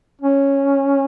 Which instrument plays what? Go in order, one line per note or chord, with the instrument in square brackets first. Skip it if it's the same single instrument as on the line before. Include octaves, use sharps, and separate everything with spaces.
[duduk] C#4